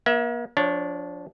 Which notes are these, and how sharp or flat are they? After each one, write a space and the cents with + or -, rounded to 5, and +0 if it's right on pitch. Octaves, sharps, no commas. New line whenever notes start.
A#3 +40 E5 +0
F3 +25 D4 -15 C#5 +0